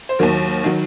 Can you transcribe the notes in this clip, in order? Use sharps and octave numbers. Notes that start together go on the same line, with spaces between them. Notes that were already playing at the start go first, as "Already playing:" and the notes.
C5
D#2 D#3 F#3 A#4
D#3 F#3